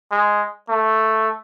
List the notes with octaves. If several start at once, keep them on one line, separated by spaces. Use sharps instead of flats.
G#3
A3